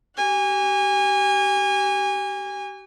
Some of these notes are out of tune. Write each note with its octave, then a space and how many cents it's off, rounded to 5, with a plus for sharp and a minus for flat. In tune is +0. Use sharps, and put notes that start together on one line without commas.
G4 -35 G#5 -30